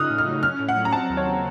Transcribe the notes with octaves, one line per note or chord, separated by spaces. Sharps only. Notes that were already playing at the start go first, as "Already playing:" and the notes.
Already playing: C#3 D#4 D#6 F6 F#6
A2
F6
F#3
C#4 F6
A2
F#5
F#3
A#5
C4 A5
D#2
C#5
C#3